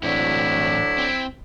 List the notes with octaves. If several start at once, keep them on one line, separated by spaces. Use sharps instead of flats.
D2 A2 E3 F#3 C4 D4 E4
C4